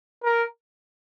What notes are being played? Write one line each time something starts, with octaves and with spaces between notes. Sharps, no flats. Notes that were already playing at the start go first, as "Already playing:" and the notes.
A#4